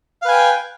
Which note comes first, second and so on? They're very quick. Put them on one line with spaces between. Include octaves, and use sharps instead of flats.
F5 B4 G#5 G5